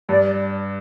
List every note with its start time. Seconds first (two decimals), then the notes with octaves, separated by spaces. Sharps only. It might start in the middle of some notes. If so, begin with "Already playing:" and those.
0.09 G2 D5